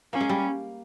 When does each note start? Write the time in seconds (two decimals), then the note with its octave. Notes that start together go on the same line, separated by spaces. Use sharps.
0.13 A#3 C#4
0.20 G#3
0.29 G3